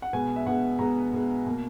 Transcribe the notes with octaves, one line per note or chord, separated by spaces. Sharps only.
F#5
B2 G#3 B3 G#5
E5
B2 G#3 B3 F#5
B2 G#3 B3 A#5
B2 G#3 B3
B2 A#3